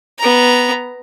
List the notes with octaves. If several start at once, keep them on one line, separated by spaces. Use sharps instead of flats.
B3 A#5